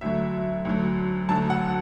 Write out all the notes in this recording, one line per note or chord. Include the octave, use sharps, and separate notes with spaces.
D2 D3 F#3 E5
D2 D3 F#3
D2 D3 F#3 A5
F#5